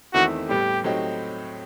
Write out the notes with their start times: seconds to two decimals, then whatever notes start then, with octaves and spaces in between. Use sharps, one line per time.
0.14 E2 D#3 A3 C4 E4 F#4
0.49 A2 G3 B3 G4
0.84 A2 F#3 C4 D#4 G4